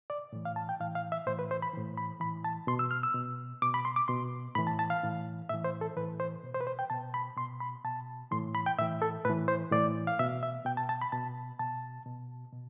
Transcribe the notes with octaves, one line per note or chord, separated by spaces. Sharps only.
D5
A2 E3
F5
A5
G5
A2 E3 F5
F5
E5
A2 E3 C5
B4
C5
B5
A2 E3
B5
A2 E3 B5
A5
B2 C6
E6
F6
E6
B2
B2 D6
B5
C6
D6
B2 C6
A2 E3 B5
A5
A5
F5
A2 E3
A2 E3 E5
C5
A4
A2 E3 B4
C5
B2
C5
B4
C5
G5
B2 A5
B5
B2 C6
B5
B2 A5
A2 E3 C6
B5
G5
A2 E3 E5
A4
A2 E3 B4
C5
A2 E3 D5
F5
B2 E5
E5
B2 G5
A5
A5
B5
B2 A5
B2 A5
B2
B2